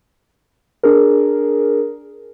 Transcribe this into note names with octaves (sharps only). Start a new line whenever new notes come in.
D4 G#4 A#4